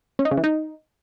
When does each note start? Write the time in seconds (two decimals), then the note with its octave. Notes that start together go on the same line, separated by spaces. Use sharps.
0.19 C#4
0.25 D#4
0.31 C#3
0.37 E3
0.44 D#4